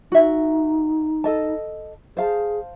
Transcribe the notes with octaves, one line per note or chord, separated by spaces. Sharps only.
D#4 F#4 E5
A4 D#5 A5
G#4 C5 F5 A5